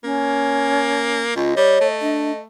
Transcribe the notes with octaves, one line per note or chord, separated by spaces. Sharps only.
A#3 C#4
C#2 F4 D#5
G3 C#5
A3
D4